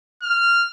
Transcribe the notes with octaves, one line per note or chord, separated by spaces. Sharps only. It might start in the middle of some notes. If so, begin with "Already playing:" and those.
F6